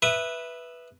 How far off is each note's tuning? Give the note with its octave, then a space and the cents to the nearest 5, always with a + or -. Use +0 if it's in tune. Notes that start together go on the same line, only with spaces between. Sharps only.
B4 -5 E5 +0 D#6 -30